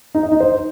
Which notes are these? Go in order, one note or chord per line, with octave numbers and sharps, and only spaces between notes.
D#4
D#5
D#4
C5